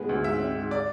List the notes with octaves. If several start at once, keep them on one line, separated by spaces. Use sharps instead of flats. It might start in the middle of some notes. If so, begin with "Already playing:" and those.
Already playing: G#2 G#3 B3
D2
G#2 E5
C4
G#2
D5